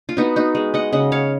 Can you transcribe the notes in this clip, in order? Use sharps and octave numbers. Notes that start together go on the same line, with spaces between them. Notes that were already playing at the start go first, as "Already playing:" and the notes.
F4
B3 D#4 F#4
D#4 F#4
G#3
D#5 F#5
C#3 D#5 F#5
C#5 F5